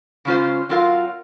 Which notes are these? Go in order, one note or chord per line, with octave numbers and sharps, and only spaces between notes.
C#3 G#3 C#4 F4 C5
F#3 C4 F4 A#4 F5